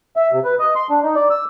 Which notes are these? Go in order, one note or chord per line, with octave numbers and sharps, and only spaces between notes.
E5
C3
B4
D#5
C6
D4
D#4
D5
E6